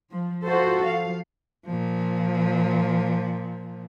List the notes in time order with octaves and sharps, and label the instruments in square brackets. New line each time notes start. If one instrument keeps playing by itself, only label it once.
[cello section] F3
F4 F#4 A4 C5
F3 F5
[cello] A#2 F3